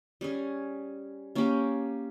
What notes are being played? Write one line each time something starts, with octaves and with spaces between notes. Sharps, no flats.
G3 C#4 G#4
A#3 C#4 G4